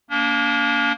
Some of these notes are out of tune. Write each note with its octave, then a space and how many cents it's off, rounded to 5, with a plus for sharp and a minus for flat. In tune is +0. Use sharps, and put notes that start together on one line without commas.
A#3 +0 D4 -45